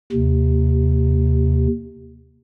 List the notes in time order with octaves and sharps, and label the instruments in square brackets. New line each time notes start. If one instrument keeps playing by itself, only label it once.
[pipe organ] D#2 C3